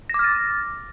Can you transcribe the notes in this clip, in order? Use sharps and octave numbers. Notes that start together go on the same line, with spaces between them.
D6 F6 A6 A#6